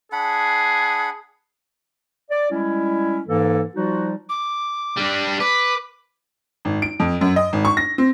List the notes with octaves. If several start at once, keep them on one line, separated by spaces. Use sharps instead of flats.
D4 G#4 F#5 B5
D5
G3 G#3 C#4 E4
G#2 E3 A#3 A4
F3 G3 D#4 F4 F#4
D6
G3 D4
B4 D6
G#1
D7
F2
F#2
D#5
G#1
C#6
A#6
C4